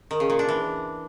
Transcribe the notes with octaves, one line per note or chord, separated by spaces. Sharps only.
D#3
C#3
A#2
D4
E3